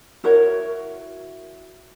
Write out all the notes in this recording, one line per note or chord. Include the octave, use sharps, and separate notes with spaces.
E4 F#4 A#4 C#5